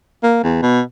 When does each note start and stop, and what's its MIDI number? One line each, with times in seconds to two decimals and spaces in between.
0.23 0.41 58
0.43 0.60 40
0.63 0.80 47